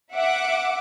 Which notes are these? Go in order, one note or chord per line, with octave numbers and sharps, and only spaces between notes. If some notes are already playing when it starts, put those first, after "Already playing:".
E5 F#5 D6